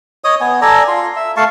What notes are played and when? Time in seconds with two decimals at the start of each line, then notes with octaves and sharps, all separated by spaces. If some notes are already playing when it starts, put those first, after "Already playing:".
0.24 C#5 D#5 D#6
0.41 B3 G#5
0.61 A4 D5 G#5 A#5
0.88 F4 C6
1.16 E5
1.37 A3 F5 A5 C#6